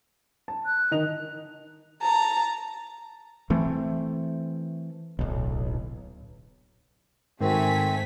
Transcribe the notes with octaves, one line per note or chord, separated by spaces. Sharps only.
A5
F#6
D#3 D#4 F7
A5 A#5
E3 A3 C4
D1 B1
G#2 D#3 A3 C4 F#4 G#5 B6